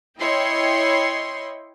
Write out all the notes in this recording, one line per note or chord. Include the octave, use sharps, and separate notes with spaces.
E4 C#5 D#5 G5 C6